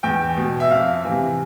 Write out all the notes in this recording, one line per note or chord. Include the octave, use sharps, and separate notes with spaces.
E2 G5
B2
E5
F2 F5
C3 E3